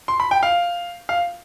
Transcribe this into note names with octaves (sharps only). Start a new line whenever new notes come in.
C6
B5
G5
F5
F5